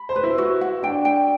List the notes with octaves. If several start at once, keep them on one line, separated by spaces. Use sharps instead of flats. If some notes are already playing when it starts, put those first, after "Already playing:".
Already playing: B5
C5
B4
E4
F#4
F#5
D4 G5
G5